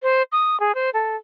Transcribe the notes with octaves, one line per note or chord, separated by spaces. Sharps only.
C5
D#6
G#4
C5
A4